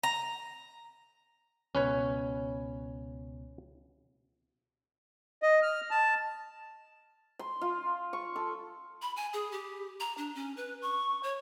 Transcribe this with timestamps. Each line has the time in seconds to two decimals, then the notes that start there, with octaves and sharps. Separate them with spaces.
0.03 A#5
1.75 C#2 B2 C#4 B4 C#5
5.43 D#5
5.62 F6
5.91 A5
7.39 C6
7.62 F4
8.13 C#6
8.36 A4
9.02 B5
9.16 G#5
9.33 G#4
9.52 G4
10.00 A#5
10.17 D4
10.35 C#4
10.57 B4
10.82 C#6
11.23 C#5